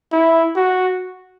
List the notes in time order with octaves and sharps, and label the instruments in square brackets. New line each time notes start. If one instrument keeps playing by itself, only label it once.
[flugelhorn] E4
F#4